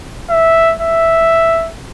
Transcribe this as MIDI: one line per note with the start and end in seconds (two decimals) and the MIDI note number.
0.30 0.74 76
0.82 1.70 76